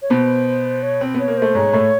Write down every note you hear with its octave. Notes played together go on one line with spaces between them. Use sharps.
C#5
B2 B3 C5
C#5
C4
B3 C#5
A#3
A3 C5
G#2 G#3 C#5
A2 A3